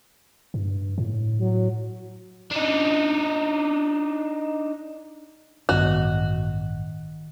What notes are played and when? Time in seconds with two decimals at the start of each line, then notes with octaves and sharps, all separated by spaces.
0.54 G2
0.98 A2
1.40 F#3
2.51 D4 D#4
5.69 A1 G2 D#3 B3 F#4